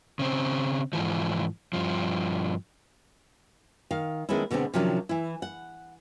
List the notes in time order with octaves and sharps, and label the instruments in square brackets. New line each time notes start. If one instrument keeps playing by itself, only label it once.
[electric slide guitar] C#3 C4
G#2 E3 F3
G2 F3
[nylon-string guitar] D#3 F5
D#3 G#3 A3 B3 C#4 E4
B2 D3 G#3 B3 C4
C3 D#3 F3 F#3 C#4 D4
E3 E4
F#5